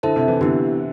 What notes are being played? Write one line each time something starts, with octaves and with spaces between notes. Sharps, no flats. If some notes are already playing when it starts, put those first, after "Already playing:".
D3 E4 A4 C5 E5 A5
C3
E3
D3 B3 E4 G4